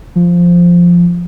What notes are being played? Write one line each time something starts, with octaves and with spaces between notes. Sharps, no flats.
F3